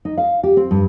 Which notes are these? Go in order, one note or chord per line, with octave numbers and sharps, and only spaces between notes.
D#4
F5
G4
C4
G2